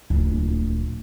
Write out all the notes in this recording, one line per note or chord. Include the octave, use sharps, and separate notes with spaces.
D1 A#1